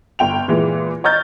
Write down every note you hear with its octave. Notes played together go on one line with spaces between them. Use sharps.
G1 G5 F7
A#2 E3 G#3
C#5 D#5 A#5 F6 G6 A6